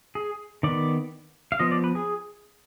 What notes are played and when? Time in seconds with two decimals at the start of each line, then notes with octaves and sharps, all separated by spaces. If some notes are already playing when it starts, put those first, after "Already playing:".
0.15 G#4
0.63 D#3 B3 D5
1.52 F5
1.59 F3 B3 D#5
1.72 D5
1.84 B4
1.95 G#4